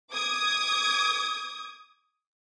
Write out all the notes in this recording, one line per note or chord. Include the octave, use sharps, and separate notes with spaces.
D6 D#6 G#6